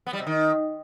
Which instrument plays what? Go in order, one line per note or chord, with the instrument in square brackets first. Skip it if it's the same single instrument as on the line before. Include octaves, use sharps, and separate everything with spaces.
[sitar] B3
G3
C3
D#3